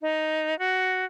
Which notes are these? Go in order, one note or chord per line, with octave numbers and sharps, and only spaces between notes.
D#4
F#4